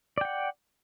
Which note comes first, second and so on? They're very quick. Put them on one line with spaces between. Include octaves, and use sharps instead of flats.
D5 G5 F#5